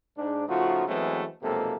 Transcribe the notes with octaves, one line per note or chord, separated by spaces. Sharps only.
G#2 D4
C#3 F3 A3 D#4 F4 F#4
E3 F#3 G#3 A3 B3 C4
B1 F2 C3 G#3 A#3 A4